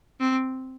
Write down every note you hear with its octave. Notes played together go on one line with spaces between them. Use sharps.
C4